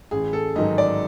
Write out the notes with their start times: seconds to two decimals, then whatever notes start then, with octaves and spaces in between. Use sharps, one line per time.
0.11 A1 G#4
0.33 A4
0.56 G#2 D#3 F#3 D#5
0.78 D5